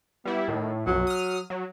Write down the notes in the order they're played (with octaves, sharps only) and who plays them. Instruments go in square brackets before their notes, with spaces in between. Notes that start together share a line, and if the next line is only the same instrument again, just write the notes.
[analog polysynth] G3 E4 [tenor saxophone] B3
[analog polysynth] A2 [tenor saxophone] D#3
[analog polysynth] B1 F#2 [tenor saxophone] F#3
[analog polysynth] D#6 F6
F#3